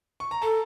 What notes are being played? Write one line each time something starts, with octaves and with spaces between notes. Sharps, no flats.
C#6
A#5
A4 A5